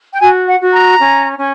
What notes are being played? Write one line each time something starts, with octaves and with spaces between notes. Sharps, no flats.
G5
F#4 G#5
F#5
F#4
A#5
C#4
C#4